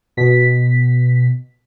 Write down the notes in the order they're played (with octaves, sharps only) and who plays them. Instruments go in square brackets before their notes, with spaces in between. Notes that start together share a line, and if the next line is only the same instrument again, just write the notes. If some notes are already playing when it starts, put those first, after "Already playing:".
[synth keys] B2 B6